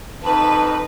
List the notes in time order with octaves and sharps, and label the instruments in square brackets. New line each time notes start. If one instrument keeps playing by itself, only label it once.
[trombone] F2 [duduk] D#4 [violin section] B4 [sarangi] A5